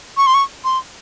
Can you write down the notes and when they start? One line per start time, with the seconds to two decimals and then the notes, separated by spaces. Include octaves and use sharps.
0.17 C#6
0.27 C6
0.34 C#6
0.64 C6